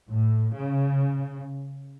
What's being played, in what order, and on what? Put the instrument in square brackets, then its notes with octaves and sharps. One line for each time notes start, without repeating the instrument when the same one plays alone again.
[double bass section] A2
C#3